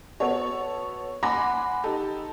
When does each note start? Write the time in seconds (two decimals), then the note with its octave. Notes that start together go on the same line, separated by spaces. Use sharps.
0.20 B3 F#4 A4 C#5
1.23 F#5 G#5 B5 C6 D6 A#6
1.84 D#4 G4 A4